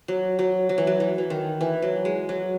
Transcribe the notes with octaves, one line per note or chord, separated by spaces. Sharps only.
F#3
F#3
F#3
E3
F#3
E3
E3
D#3
E3
F#3
G#3
F#3